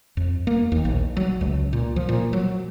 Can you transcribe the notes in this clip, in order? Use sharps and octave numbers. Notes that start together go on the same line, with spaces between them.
F2
A#3
D#2
A#1
F#3
C#2
A#2
F3
A#2
F#3